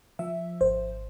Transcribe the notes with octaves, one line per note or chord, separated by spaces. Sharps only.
F3 E5
G#1 C5